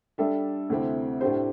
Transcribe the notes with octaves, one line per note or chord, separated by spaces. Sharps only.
G3 D4 A4 E5
D2 C3 A3 C4 E4
A2 A3 D4 G4 C5